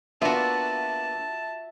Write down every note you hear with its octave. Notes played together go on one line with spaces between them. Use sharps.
A#3 B3 D4 F4 F#4 E5 A5